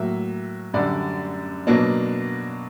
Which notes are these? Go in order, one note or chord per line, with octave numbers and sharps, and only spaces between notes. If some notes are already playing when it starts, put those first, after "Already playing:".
Already playing: A2 F#3 A#3 E5
F#2 D3 G3 D5
B2 F#3 A#3 D4